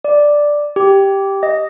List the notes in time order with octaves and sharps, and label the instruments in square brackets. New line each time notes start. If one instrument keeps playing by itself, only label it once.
[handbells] D5
G4
D#5